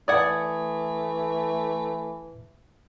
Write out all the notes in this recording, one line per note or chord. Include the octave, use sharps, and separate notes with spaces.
E3 A3 D5 F#5 D#6 G#6